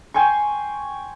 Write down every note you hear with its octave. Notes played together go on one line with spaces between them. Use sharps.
G5 G#5 C6 C#6